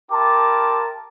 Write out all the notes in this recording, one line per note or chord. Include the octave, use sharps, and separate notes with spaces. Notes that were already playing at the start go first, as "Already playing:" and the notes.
E4 G4 A#4 A5 C6 D6